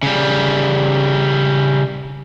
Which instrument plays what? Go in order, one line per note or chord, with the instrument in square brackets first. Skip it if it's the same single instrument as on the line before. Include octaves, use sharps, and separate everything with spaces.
[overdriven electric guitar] C#3 G3